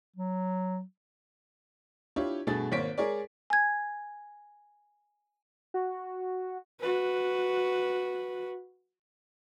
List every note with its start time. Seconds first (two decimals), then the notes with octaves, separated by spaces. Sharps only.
0.16 F#3
2.16 D4 E4 F4 G4 C#5
2.47 G2 B2 A3 G#4 A6
2.71 G#1 A#3 C5 C#5 B6 D7
2.98 G#3 G#4 A#4 C#5 D5
3.50 G#5 G#6
5.74 F#4
6.80 F#4 B4